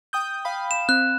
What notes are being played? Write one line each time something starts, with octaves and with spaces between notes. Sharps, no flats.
G5 D#6 G6
F5 B5
E7
C4 F#6